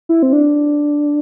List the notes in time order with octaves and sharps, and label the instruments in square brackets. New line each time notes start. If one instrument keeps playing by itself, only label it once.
[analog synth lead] E4
C4
D4